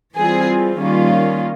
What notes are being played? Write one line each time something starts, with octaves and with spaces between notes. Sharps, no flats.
E3 G3 C4 F4 G#4
D#3 G3 A#3 C#4 F4